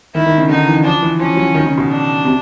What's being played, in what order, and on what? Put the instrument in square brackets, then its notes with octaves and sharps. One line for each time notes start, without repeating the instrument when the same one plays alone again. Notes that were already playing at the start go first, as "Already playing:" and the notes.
[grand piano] D#3 [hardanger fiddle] E4
[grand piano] D#3
C#3
[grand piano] D3 [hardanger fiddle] D#4
[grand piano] E3
[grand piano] F3 [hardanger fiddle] D4
[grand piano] E3
[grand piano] F3 [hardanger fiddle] C#4
[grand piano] F#3
D#3
C#3
B2
[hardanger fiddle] D4
[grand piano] C3